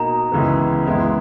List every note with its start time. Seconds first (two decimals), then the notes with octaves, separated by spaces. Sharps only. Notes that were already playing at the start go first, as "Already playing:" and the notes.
Already playing: B2 A#3 D#4 A#5
0.32 C#2 C#3 E3 G#3 B3
0.86 C#2 C#3 G#3 B3 E4